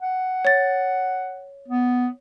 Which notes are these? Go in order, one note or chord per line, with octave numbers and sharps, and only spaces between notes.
F#5
C#5 A6
B3